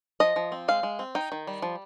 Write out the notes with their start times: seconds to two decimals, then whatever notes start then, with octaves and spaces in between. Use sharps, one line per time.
0.20 F3 D#5
0.36 F3
0.52 C4
0.68 G#3 F5
0.83 G#3
0.99 C4
1.15 D#4 G5
1.32 D#3
1.47 G3
1.62 F3